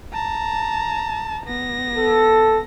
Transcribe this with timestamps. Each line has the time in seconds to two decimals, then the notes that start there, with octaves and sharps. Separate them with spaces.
0.13 A5 A#5
1.46 B3 A#6
1.97 A4